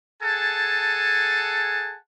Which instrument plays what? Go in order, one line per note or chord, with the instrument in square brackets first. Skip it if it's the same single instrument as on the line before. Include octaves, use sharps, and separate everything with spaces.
[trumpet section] G#4 A4 F#5 G#5 A5